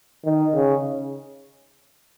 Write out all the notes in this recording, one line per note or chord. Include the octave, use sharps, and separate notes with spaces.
D#3
C#3